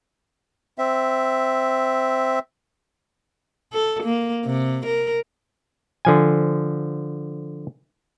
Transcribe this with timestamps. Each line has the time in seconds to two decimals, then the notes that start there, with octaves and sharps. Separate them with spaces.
0.78 C4 E5
3.73 A4
4.03 A#3
4.45 C3
4.86 A#4
6.05 D3 F3 G#5